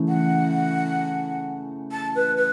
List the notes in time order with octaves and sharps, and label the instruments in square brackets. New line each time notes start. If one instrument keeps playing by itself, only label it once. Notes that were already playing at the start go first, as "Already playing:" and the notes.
Already playing: [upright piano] C#3 E3 A3
[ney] F#5
A5
B4
B4